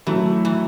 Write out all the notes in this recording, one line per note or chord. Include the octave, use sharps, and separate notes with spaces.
E3 F#3 A3 E4
E3